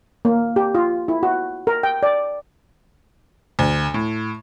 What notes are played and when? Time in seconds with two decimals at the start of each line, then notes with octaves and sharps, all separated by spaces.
0.25 A#3
0.56 G4
0.75 F4
1.08 E4
1.23 F#4
1.67 A#4
1.83 G5
2.03 D5
3.59 D2
3.94 A2